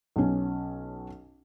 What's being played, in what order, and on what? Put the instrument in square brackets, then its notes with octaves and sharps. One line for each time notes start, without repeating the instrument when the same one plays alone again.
[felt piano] B1 C#4